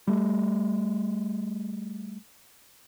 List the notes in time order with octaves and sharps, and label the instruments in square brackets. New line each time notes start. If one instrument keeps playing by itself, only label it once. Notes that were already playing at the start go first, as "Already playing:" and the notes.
[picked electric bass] G3 A3